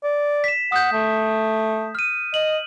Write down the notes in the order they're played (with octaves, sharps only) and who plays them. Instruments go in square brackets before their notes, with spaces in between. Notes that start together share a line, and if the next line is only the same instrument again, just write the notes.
[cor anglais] D5
[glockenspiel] B6 E7
[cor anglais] F#5 [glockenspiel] D#6 G6
[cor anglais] A3
[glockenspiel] F6 D#7
[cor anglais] D#5 [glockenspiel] F#7